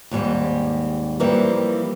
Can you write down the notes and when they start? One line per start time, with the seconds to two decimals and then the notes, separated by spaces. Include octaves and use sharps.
0.11 D#2 G#2 G3 C4
1.20 E3 F3 G3 A#3 C4